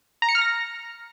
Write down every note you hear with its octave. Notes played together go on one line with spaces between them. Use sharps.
A#5
C#7
F6
A#6